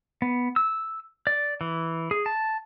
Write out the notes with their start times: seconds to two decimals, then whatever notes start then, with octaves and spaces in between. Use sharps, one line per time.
0.22 B3
0.56 E6
1.27 D5
1.61 E3
2.11 G#4
2.26 A5